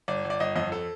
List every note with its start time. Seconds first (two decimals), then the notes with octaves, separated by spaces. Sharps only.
0.08 G1 D5
0.25 G1
0.30 D5
0.40 G1 D#5
0.56 F2 D#5
0.72 A4